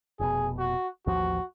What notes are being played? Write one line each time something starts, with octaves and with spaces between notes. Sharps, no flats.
F1 B2 G#4
F#4
A1 D#2 F3 F#4